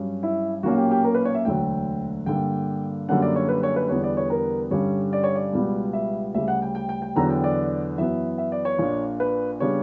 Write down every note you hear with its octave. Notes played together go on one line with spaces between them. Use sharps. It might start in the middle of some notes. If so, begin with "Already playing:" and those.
Already playing: G2 F#3 C#4
E4
B1 A#2 A#3 C#4 F#4
G4
G4
A#4
B4
C#5
E5
E1 D2 D3 F#3 G5
G2 D3 A#3 G5
F#2 D3 G3 A#3 C#4 F#5
D5
C#5
B4
C#5
B4
E2 D3 G3 B3 D4 C#5
D5
C#5
A#4
G2 D3 G3 C#4 C#5
D5
C#5
D5
C#2 B2 G3 B3
E5
D2 C#3 G3 E5
F#5
G5
G5
G5
G5
E2 D3 F#3 B3 A#5
G5
D5
F#2 E3 B3 E5
E5
D5
C#5
A#1 A#2 A#3 D4
B4
C#3 G3 B3 D4 C#5